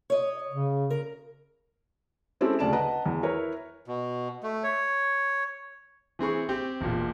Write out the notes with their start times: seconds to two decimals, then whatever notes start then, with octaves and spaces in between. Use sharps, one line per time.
0.10 C#5 D#5
0.49 C#3
0.90 A#4
2.41 G#3 C4 C#4 E4 G4 A4
2.59 D2 C#3 D5 A5 E7
2.73 B4 D#5 F#5 A5 A#5
3.06 E2
3.23 E4 A#4 B4 C#5
3.88 B2
4.43 A3
4.64 C#5
6.19 E3 C4 G#4 C#6
6.49 C4 G4
6.81 E1 A#2 F4